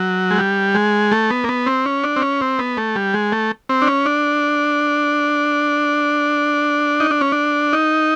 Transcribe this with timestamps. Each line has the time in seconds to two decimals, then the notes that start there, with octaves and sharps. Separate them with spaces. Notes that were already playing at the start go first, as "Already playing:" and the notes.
Already playing: F#3
0.31 G#3
0.38 G3
0.75 G#3
1.12 A3
1.30 B3
1.44 A#3
1.49 B3
1.66 C4
1.86 C#4
2.04 D4
2.16 C4
2.22 C#4
2.41 C4
2.59 B3
2.77 A3
2.96 G3
3.14 G#3
3.32 A3
3.69 C4
3.82 D4
3.87 C#4
4.06 D4
7.00 D#4
7.11 D4
7.21 C#4
7.32 D4
7.73 D#4